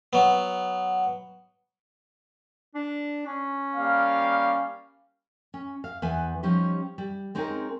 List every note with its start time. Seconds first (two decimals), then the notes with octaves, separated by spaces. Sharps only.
0.13 F#3 B3
2.75 D4
3.26 C#4
3.75 G3 A#3 F5
5.54 C#4
5.84 F5
6.02 E2 B4 G#5
6.43 F3 G3 C#4 D#4 G4
6.98 G3
7.35 G#3 C4 C#4 D#4 G#4 A#4